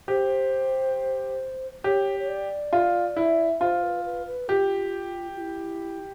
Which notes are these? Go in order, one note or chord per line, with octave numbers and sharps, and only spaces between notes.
G4 C5
G4 C#5
C#5
D5
F4
E4
F4 C5
B4
B4
B4
F4 G4
F4
E4